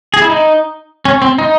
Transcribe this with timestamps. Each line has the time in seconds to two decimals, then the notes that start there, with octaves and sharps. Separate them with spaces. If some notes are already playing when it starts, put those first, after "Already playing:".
0.14 G#4
0.22 E4
0.30 D#4
1.05 C#4
1.22 C4
1.38 D#4